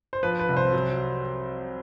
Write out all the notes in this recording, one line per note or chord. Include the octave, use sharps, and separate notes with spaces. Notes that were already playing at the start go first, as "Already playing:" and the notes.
C5
F3 B4
B4
C2
C5
F#3